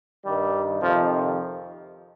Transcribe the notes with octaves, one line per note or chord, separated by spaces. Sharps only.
G2 D#3 G3
F2 C3 D#3 F3